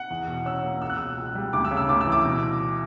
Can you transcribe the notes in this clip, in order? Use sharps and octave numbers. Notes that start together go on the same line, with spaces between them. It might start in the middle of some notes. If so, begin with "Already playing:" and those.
Already playing: F#5
E2
B2
C#4 E6
A#3
C#2 E6
F#6
B2 E6
C#2
G3
D2 D6
E6
C#3
E6
D2 D6
E6
E3
D6
B2